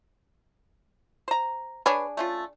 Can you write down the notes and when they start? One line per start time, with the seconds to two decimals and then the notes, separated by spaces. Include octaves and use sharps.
1.28 C5 A#5
1.86 D4 G#4 B4 C#5
2.17 A3 C#4 F4